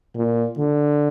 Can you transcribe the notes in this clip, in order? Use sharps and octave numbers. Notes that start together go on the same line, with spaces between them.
A#2
D3